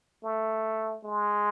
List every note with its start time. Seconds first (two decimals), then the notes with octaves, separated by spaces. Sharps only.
0.24 A3
1.04 G#3